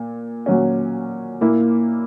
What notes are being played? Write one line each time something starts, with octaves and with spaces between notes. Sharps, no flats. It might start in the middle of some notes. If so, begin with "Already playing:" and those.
Already playing: A#2
A#2 F#3 C#4
A#2 A#3 E4